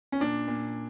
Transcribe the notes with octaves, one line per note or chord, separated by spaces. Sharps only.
C#4
A#2 D4
A#2